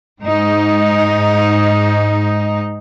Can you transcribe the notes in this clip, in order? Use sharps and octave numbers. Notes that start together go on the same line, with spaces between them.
G#2 D#4